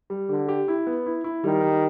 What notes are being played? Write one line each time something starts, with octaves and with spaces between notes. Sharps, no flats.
G3
D3 G4
G4
E4
B3
E4
E4
D#3 G3
G3